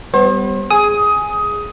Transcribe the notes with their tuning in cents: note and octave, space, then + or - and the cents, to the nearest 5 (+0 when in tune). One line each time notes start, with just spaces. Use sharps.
G3 +0 B3 +25 C5 +45
G#4 +0 D#6 +15